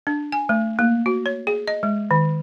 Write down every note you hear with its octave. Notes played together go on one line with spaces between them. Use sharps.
D4
G#5
A3
A#3
F#4
C#5
G#4
D#5
G#3
D#3